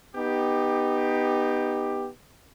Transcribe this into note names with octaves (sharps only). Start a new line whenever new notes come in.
B3 D#4 G4